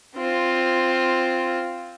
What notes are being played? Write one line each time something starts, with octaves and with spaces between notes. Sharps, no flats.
C4 F4